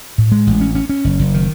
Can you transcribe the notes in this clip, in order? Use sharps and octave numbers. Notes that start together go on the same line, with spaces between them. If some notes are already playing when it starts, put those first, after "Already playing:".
A2
G#3
A1
C#4
C#4
C#4
F#1
F#1
D#3